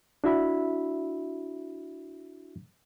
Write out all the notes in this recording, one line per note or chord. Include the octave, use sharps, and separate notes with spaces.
D4 E4 F#4 E5 B5